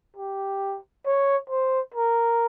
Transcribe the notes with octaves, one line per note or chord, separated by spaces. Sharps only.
G4
C#5
C5
A#4